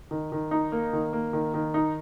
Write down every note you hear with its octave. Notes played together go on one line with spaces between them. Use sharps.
D#3
D#3
D#4
A#3
D#3
A#3
D#3
D#3
D#4